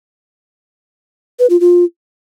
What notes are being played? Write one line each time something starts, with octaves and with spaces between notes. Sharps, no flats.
B4
F4
F4